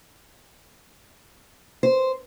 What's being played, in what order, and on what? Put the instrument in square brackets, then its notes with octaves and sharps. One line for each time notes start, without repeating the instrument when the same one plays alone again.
[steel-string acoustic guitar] C5